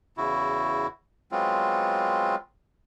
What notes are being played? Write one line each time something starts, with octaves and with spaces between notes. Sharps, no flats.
E2 C#3 E4 F#4
F#3 G#3 B3 C4 F4